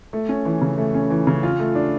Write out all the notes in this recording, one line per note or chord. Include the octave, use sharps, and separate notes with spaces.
A3
C#4
E3
C#3
A3
C#4
E3
C#3
F4
A3
D4